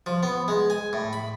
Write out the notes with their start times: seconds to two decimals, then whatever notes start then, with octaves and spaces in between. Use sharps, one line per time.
0.06 F3
0.23 B3
0.48 G#3
0.70 G#5
0.93 A2
1.13 B5